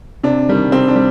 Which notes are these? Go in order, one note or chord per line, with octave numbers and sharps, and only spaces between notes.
C3 D4
D#3 G3
C3 C4
D4
G3